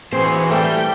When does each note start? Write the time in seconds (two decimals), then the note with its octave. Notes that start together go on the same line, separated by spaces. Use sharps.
0.13 E3 C4 F#4 G#4 C5
0.51 G3 A3 G5